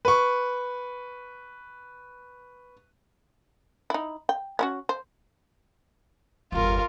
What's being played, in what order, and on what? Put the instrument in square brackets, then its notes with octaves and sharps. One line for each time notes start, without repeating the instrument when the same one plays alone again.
[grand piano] B4 C#6
[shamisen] D#4 E4
G5
C#4 E4 F#4
C5
[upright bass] G1 E2 [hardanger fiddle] F4 A#4